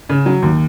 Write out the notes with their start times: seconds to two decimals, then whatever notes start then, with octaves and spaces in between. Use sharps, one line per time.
0.09 C#3
0.26 F#3
0.42 D#2